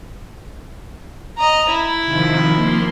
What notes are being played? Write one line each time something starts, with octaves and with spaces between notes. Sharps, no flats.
D#5 A#5
E4
C3 D#3 F3
F3 A#3 C6